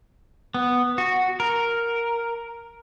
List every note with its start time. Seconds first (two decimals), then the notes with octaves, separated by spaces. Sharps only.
0.54 B3
0.98 F#4
1.40 A#4